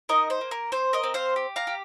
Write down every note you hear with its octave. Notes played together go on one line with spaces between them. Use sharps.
D#4 A#4 D#5
C5
A#3
A#4
C4 C5
A#4 D#5
C4
C5 F5
G4
F5 A#5
G4